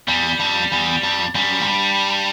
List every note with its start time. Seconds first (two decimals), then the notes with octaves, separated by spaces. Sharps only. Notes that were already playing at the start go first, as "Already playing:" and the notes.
0.08 E2 G3
0.40 F2
0.72 E2
1.03 F2
1.35 F#2 G3
1.60 G#2
1.67 G2